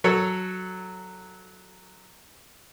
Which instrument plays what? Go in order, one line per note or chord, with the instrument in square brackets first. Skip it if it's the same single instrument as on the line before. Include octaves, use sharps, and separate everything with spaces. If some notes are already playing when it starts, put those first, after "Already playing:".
[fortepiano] F#3 A4 C#5